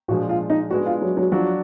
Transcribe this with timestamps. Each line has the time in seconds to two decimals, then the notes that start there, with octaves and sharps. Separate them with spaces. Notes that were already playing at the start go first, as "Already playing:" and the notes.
0.08 A#2 F3 G#3 D4 F#4
0.29 F4
0.50 D#4
0.70 G#3 B3 D4 F#4
0.86 F4
1.02 F#3
1.17 F#3
1.32 F3 F#3 D4 F#4